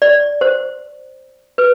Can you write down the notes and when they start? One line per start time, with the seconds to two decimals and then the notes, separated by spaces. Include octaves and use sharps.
0.02 D5
0.41 C5
1.58 B4